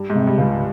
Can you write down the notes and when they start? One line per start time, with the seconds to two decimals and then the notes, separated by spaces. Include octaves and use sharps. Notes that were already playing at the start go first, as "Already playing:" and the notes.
Already playing: G2
0.10 G#2
0.15 C3
0.27 G2
0.38 C#2
0.43 G#2